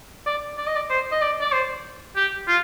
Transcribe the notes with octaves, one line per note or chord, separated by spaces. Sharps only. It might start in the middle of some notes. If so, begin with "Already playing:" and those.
D5
D5
D#5
D5
C5
D#5
D5
D5
C5
G4
F4